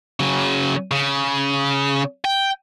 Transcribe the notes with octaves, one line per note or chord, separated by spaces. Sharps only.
C#3 F#3
C#3
G5